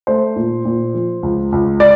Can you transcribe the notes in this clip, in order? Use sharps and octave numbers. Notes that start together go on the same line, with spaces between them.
A3 C5
A#2
A#2
F3
C#2
C#2
D5